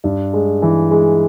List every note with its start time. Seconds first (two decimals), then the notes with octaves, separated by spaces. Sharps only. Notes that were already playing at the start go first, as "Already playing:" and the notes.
0.04 G2
0.33 G#3
0.62 E3
0.91 G#3